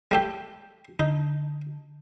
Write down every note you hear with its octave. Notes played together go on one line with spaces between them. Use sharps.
G3 A3 G4
D3 D#4